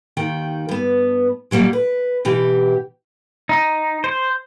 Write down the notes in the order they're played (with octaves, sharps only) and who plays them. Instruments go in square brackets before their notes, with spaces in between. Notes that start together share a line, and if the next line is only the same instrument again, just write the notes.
[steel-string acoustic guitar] D#2 D#3 G5
G2 B3
A#2 F#3 G3 A#3
B4
B2 E3 G4
[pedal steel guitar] D#4
C5